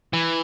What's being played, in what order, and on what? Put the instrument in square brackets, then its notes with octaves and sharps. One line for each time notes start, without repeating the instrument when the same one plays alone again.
[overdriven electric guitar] E3